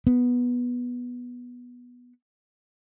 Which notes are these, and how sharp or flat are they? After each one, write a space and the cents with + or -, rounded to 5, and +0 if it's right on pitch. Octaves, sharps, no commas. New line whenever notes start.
B3 -10